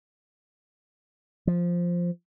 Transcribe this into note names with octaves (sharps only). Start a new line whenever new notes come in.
F3